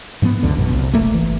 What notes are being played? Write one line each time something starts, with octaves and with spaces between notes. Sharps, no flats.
G#2 F3 F#3 B3
C#2 F#2 D3
A1 F#2 B2
C2
D#1 B1 A3 A#3
G1 E3